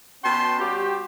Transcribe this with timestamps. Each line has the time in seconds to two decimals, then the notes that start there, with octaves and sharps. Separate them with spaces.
0.23 B2 C#4 G5 A5 C6
0.58 G3 F#4 G4